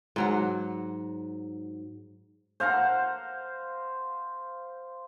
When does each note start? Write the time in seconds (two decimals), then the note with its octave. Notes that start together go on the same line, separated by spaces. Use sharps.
0.16 G#2 F#3 F#5
2.60 C5 F5 F#5 A#5